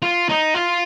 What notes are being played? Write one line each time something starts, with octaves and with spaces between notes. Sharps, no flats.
F4
D#4
F4